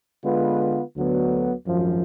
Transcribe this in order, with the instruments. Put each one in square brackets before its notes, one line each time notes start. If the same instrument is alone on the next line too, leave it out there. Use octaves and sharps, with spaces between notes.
[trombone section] D3 G#3 B3 F4 B4
D2 D3 F#3 B3
G#1 F#2 F3